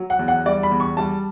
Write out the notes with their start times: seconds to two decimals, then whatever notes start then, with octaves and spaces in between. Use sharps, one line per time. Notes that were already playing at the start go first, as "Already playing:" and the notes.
Already playing: F#3
0.10 F#5
0.19 E2
0.28 F#5
0.46 G3 D5
0.63 B5
0.72 E2
0.80 C#6
0.97 G3 A5